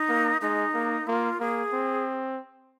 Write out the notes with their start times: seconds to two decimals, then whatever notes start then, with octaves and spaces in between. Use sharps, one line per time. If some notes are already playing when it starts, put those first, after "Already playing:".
Already playing: D#4
0.09 A#3
0.41 G#3 D#4
0.74 A#3
1.07 A#3 F4
1.40 A#3 G#4
1.73 C4